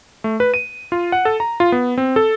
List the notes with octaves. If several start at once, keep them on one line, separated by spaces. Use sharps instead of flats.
A3
B4
D#7
F4
F#5
A4
A#5
F4
B3
C4
A4